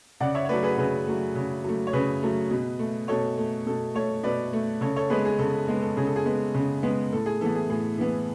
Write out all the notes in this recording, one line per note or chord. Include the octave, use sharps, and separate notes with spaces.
C#3 D5 F#5
C#5 E5
C#5
F#3 A3 B4 D5
G#4 B4
C#3 G#4 B4
F#3 A3
C#3
F#3 A3
C#5
C#3 G#4 B4
F#3 A3
B2
A3
B2 A4 C#5
A3
B2 A4
A3 A4 C#5
B2 B4 D5
A3
C#3 A4 C#5
A4 C#5
G#3 B3 G#4 B4
G#4
C#3 A4
A4
G#3 B3
A4
C#3 G#4
A4
G#4
G#3 B3
C#3
G#3 B3
A2 A4
G#4
E3 B3 A4
G#4
A2 G#4
E3 B3